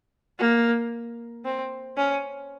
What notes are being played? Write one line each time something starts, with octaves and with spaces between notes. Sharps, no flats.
A#3
C4
C#4